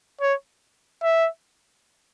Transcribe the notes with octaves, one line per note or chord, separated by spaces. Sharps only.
C#5
E5